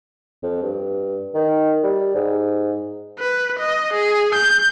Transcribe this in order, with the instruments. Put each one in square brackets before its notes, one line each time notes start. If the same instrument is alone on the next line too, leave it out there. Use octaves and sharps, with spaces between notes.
[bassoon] F2
G2
D#3
G3
G#2
[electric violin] B4
D#5
G#4
G6